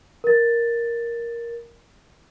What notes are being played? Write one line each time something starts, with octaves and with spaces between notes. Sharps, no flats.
A#4 A6